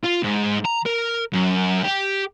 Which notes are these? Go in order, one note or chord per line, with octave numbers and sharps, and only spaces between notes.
F4
G#2
A#5
A#4
F#2
G4